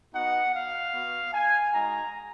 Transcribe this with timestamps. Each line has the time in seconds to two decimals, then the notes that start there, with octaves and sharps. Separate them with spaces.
0.13 B3 D#4 F#4 F#5
0.53 F5
0.93 B3 F#4
1.33 G#5
1.73 G#3 D#4 F#4 A#5